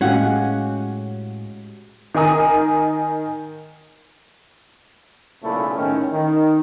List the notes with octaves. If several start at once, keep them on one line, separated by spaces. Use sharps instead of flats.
A2 G#3 C#4 F#4 G4 F5 F#5
D#3 D#4 A#4 G#5 D#6
B1 A#2 C#3 A3 E4
A2 D#3 C#4
D#3